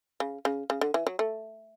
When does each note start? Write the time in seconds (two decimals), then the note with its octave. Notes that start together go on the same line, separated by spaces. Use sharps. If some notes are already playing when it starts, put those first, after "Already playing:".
0.20 C#3
0.45 C#3
0.70 C#3
0.81 D3
0.94 E3
1.07 F#3
1.19 A3